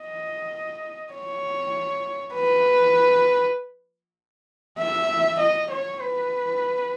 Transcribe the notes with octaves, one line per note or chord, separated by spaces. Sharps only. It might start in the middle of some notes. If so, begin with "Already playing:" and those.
Already playing: D#5
C#5
B4
E5
D#5
C#5
B4